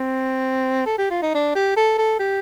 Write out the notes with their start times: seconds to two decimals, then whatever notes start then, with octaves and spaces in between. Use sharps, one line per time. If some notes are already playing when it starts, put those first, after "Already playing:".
Already playing: C4
0.86 A4
0.98 G4
1.11 F4
1.22 D#4
1.35 D4
1.55 G4
1.77 A4
1.98 A4
2.19 G4